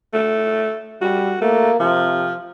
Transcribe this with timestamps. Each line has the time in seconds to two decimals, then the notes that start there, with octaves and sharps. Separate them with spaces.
0.13 A3
1.01 G3 F#4
1.41 A3 A#3
1.80 C3 F3